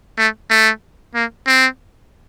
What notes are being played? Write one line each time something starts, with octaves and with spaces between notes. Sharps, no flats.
A3
A3
A#3
C4